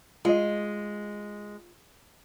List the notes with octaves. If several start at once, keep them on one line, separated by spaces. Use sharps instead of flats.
G#3 F4 D#5